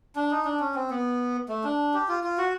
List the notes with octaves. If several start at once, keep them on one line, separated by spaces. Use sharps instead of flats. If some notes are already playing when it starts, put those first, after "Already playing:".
D4
D#4
D4
C#4
C4
B3
A3
D4
G4
F4
F4
F#4